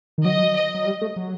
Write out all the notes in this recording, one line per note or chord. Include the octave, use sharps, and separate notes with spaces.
D#3
F#3 D#5
D#5
F#3
G3
A3
F#3